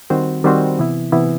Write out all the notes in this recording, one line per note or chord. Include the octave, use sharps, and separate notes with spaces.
D#3 G3 C4 F#4 C5
D#3 G3 C4 F#4 C5
C3 E3 B3 E4
C3 E3 B3 E4